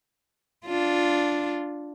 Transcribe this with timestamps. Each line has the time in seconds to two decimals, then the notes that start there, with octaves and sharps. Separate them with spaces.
0.66 D4 F4